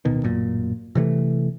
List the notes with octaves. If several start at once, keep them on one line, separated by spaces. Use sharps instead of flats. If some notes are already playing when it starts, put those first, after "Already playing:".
D1 B2 D#3
A1 F#2 A#2
C3 E3 G#3 A3